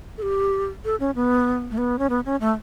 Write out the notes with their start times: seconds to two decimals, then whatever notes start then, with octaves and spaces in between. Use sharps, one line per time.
0.18 A4
0.22 G4
0.85 A4
1.00 C#4
1.15 B3
1.71 A3
1.78 B3
1.99 C#4
2.09 B3
2.25 C#4
2.41 A3